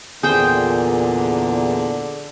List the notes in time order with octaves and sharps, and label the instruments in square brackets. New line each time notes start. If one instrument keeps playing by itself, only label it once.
[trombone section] E2 A#2 [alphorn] D3 [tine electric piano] G#4 [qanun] C5 G5